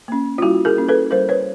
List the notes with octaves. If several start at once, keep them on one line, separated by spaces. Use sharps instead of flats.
A#3 C#4
F4
G3 E4 F#4
G#4 A#4
A#3 C#4
A4 B4
G3 A#4 C5
B4 C#5